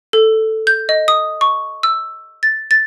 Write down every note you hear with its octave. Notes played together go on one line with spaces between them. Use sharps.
A4
G6
D#5
D#6
C#6
E6
A6
A6